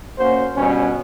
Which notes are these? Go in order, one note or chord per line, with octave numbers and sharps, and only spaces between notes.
A#3 C#4 F#4 C5
G2 B2 C#4